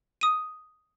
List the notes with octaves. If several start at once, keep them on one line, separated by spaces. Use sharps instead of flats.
D#6 D#7